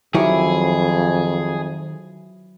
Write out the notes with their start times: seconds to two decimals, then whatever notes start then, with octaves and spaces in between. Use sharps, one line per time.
0.14 F2 D#3 F#3 E4 G4 G#4 C#5